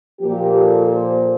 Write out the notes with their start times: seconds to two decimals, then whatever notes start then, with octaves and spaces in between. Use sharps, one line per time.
0.20 A#2 F3 A#3 G4
0.55 A4
0.90 C5